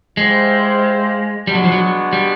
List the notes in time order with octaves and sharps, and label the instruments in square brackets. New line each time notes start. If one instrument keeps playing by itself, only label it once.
[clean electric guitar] G#3 [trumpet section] E4 G4 C5 F5
[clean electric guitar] G3 [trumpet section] G#3 B3 D4 F#4
[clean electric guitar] F#3
F3
F#3
G3